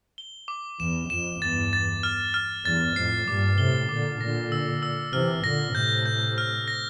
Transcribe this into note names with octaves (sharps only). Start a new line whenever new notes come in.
G7
D6
E2 E7
F2 E7
E2 G2 A6
A6
F6
F6
E2 G2 A6
F2 A2 C7
G2 A#2 D6
A2 C3 G7
A#2 D3 D6
A#2 D3 A#6
E6
E6
C3 E3 F6
A#2 D3 A#6
A2 C3 G6
G6
F6
A#6